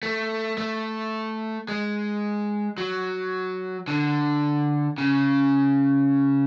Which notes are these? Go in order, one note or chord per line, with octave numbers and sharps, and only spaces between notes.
A3
A3
G#3
F#3
D3
C#3